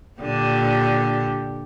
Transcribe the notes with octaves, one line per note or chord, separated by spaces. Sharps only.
A#2 D3 G4